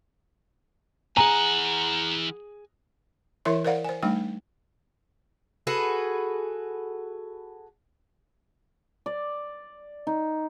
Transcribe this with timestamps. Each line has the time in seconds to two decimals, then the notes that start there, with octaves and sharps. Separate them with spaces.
1.17 E3 G#4 F#5 G#5 A#5
3.45 E3 E4 A#4 C#5 E5 C6
3.65 A#4 C5 D5 F5 F#5
3.84 C5 G#5
4.03 G3 A3 D4 D#4 G5
5.67 F#4 G#4 A4 B4
9.06 D5
10.07 D#4